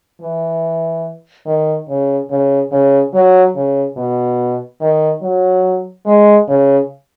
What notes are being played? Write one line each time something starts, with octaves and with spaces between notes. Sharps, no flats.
E3
D#3
C#3
C#3
C#3
F#3
C#3
B2
D#3
F#3
G#3
C#3